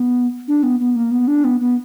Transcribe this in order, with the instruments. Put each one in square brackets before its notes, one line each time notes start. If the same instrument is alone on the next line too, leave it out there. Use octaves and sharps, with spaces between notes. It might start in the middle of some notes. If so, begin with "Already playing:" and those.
Already playing: [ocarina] B3
D4
B3
B3
A#3
B3
D4
B3
B3